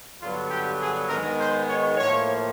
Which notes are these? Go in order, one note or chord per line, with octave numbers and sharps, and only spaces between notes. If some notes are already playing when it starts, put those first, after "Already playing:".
G2 D3 F#3 B3 F4
G4
G#4
G#2 D#3 G#3 B3 A#4
C5
C#5
A2 F3 A#3 C#5